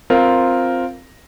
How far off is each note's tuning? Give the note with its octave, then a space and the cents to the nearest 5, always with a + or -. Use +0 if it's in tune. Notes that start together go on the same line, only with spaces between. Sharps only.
C4 +0 F4 +0 A#4 +0